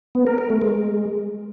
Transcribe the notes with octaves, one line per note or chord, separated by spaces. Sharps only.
B3
A#4
A#4
A3
G#3